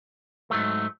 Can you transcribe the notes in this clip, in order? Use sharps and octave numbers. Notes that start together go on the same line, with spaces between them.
G#2 F#3 A3